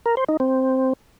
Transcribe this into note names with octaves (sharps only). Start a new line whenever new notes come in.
A#4
C5
D#4
C4